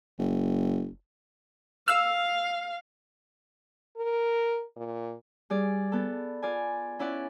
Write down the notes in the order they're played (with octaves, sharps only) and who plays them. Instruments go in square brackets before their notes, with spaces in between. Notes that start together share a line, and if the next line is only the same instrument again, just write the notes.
[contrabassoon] F#1
[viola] F5 [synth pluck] E6 F6
[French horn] A#4
A#2
[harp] G3 G#4 D5
B3 A4
F4 D5 G#5
C#4 E4 D5 F#5